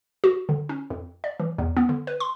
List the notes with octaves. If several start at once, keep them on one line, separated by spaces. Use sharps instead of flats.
F#4
D3
C#4
F2
D5
E3
E2
B3
D3
B4
C6